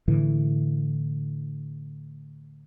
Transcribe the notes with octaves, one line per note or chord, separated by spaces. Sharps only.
A2 D3 E3